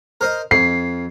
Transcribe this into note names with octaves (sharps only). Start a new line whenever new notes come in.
A#4 C5 D#5
F2 C7